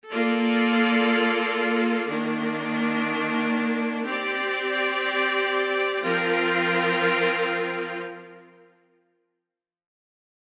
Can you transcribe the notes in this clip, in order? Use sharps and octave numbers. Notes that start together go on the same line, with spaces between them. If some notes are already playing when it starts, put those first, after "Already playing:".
A#3 F4 A4 D5
D#3 A#3 D4
C4 G4 D5
F3 C4 F4 A#4